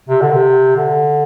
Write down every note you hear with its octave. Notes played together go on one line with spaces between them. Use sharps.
C3
D3
C3
D3